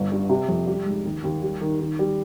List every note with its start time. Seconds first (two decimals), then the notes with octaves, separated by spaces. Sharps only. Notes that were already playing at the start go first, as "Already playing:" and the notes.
Already playing: G1
0.12 G2
0.29 C3
0.48 F2
0.67 G3
0.86 G#2
1.05 D#2
1.24 D#2
1.42 G3
1.61 D#3
1.80 D#3
1.99 G3